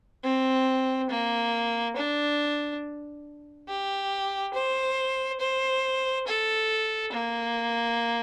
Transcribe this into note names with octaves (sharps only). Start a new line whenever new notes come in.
C4
A#3
D4
G4
C5
C5
A4
A#3